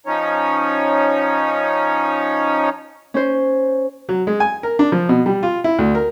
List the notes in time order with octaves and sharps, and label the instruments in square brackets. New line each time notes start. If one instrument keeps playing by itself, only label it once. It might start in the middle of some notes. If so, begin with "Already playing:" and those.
[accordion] F3 C#4 D#4 C#5
[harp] C#4 C5
[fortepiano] F#3
G#3
G#5
A#4
D4
F3
B2
G3
F4
E4
D2
A#4